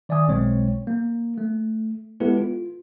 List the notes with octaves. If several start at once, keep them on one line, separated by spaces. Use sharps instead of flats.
D#3 D5 E5 G#5 D#6
B1 B2 G#3 C4 C#5
A#3
A3
G#3 B3 E4 G4 A4 B4
F4